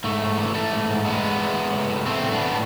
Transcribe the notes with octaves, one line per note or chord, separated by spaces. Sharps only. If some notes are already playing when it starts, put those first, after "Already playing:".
G#2 A3
G#2
E3
E3 A3
G#2
G#2
A2 G#3 B3
A2
E3
E3
A2
A2
A2 A3 C4
A2
B3 D4
E3